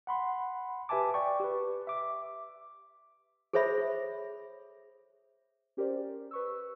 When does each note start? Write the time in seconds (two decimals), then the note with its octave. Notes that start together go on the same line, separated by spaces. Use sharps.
0.07 F#5 B5 C6
0.89 G4 B4 E5 G#5 A5 D6
1.14 D5 G5 C#6
1.40 G4 B4
1.87 E5 D6
3.53 G#4 A4 C5 C#5 E5 B5
5.77 C#4 G4 A#4 C5 D5
6.31 B4 C#6 E6